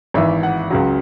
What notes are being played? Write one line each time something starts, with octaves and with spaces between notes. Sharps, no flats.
G#1 G#2 E3 E5
F#5
C#2 C#3 F#3